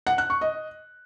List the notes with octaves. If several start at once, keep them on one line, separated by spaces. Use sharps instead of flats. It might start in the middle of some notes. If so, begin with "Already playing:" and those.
F#5
F#6
C#6
D#5